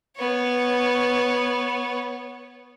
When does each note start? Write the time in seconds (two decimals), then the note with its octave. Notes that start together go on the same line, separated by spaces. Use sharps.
0.17 B3 C#5